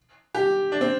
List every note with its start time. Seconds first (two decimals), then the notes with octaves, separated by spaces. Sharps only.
0.35 G4
0.72 D4
0.81 C4